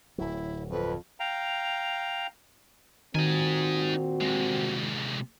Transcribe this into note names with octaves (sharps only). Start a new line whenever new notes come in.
D1 F#3 E4
F2 B4
F5 G5 A#5
A#2 D#3 C4 D#4 F#4 G#5
C3 G#3